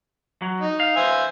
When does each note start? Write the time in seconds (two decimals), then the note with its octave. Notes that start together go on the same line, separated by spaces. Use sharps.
0.42 F#3
0.60 D#4
0.80 F5
0.96 C5 E5 G#5